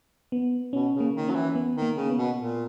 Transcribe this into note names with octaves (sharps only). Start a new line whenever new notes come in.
B3
B2 C#4
C#3
A#3
D#3
F#3 C#4
E3
B3
D#3
A#3
C#3
B3
B2
A#2